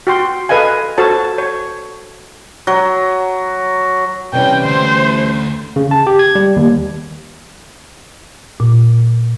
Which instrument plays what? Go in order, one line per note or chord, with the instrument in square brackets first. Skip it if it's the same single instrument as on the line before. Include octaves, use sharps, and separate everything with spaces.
[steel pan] F#4 G5 C6
A4 B4 D#5 F5 G#5
F#4 A4 C5 C#5 A5
C#5
[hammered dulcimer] F#3
[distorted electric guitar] C3 [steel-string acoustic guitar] E3 G3 C#4 [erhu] G5
[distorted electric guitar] D2 A3 [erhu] C5
[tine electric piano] C#3
A5
G4
G#6
G3
D#2
[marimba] A#2